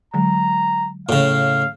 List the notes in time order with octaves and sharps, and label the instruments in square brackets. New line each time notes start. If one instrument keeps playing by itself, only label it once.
[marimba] D3 F#3 G#3 [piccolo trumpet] A#5
[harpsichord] A2 C#3 [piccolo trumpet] F5